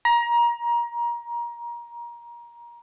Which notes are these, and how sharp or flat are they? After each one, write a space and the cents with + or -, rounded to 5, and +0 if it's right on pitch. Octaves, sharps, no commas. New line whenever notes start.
A#5 +25